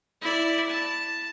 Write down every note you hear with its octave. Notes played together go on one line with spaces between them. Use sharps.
E4 D5
A5